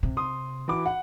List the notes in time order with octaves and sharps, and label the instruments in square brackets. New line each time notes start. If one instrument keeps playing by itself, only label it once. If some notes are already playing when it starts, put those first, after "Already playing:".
[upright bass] C3
[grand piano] C6 D#6
E3 F#4 D6
F#5